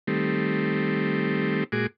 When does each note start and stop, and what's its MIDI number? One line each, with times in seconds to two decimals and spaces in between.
0.07 1.64 51
0.07 1.64 55
0.07 1.64 57
0.07 1.64 60
1.72 1.87 46
1.72 1.87 56
1.72 1.87 66
1.72 1.87 68
1.72 1.87 86